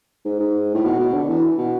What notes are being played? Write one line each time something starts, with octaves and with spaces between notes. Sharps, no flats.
G#2
G#2
A2
B2
B2
D3
E3
B2